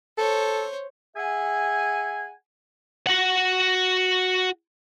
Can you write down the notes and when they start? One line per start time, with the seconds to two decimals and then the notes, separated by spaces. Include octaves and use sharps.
0.18 A4 C5 C#5
1.16 G#4 E5 F#5 G#5
3.07 F#4 F#5